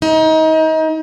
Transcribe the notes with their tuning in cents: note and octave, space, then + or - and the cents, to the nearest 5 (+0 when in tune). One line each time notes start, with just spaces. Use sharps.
D#4 +30